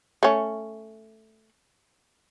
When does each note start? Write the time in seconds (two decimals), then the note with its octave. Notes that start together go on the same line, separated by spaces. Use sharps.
0.23 A3 C#4